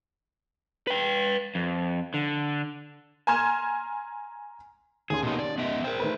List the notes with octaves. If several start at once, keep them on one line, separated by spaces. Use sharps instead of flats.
B4 G5
F2
D3
G#5 A#5 C6 F6 G#6 E7
D#2 C#4 G#4 C6
B2 A#3 D#4
D5
B3 D#5 E5
A#4 C5 G5
D#3 A3 B4